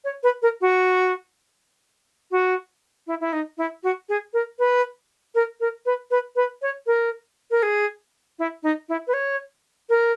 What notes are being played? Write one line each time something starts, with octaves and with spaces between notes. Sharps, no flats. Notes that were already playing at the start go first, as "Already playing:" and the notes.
C#5
B4
A#4
F#4
F#4
E4
E4
D#4
E4
F#4
G#4
A#4
B4
A#4
A#4
B4
B4
B4
C#5
A#4
A#4
G#4
E4
D#4
E4
B4
C#5
A#4